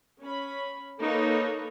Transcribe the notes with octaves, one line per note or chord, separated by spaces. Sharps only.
C#4 B5
A#3 D#4 A4 B4 C#5